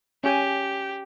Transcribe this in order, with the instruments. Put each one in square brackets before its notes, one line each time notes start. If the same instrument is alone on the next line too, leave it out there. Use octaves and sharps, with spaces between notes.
[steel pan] C#4 G#5 [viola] G4